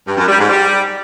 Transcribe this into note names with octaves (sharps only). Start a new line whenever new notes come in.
G2
F#2
G3
G#2
G3